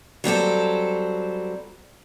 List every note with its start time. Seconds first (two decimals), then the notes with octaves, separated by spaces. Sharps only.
0.24 F#3 G3 C4 A4